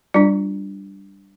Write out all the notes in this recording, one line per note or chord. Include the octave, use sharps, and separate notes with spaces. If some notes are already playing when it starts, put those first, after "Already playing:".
G3 D4 F4